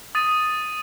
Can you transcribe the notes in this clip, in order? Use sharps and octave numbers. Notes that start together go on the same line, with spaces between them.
D#6 A6 D#7